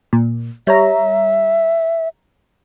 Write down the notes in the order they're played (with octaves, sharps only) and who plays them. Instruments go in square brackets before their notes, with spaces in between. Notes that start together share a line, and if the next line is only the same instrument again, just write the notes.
[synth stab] A#2
[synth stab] G3 C#5 A#5 [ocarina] E5